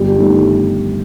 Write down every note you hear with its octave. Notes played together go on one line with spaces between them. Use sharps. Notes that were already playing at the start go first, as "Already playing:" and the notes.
Already playing: G1 G4
G2 D#3 A3